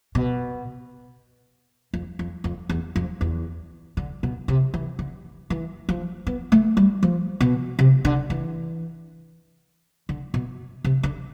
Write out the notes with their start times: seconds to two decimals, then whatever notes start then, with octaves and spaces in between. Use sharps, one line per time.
0.15 B2
1.94 F2
2.19 F2
2.44 F2
2.69 E2
2.96 F2
3.21 E2
3.97 D3
4.23 B2
4.48 C3
4.74 E3
4.99 D3
5.50 E3
5.89 F3
6.27 B3
6.52 A3
6.77 G3
7.03 F3
7.40 B2
7.79 C3
8.05 D3
8.30 E3
10.09 D3
10.34 B2
10.84 C3
11.03 D3